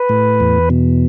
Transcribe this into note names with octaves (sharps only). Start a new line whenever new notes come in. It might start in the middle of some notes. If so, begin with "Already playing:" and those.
Already playing: B4
A2
E2
B2